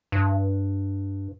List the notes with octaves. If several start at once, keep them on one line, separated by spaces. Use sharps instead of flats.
G2